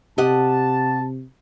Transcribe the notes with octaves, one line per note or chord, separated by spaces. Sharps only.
C3 G4 D#5 F#5 A5